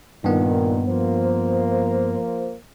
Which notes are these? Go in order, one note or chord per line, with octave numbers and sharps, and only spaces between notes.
G2 A#2 D#3 B3
F3 A#3 C5